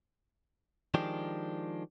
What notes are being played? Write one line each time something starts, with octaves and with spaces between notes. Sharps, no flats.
D#3 F3 G#3 D4 G4